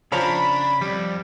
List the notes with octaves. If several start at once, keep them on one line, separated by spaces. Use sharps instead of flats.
C#3 F3 D4 C#5 A#5 B5
F2 G3